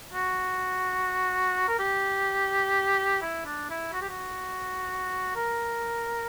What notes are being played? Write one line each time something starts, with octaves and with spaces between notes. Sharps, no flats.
F#4
A#4
G4
E4
D4
E4
F#4
G4
F#4
A#4